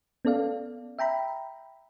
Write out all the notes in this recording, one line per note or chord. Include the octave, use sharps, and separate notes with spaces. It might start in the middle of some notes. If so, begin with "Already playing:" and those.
B3 C#4 A4 D5 F5
E5 G5 A#5 B5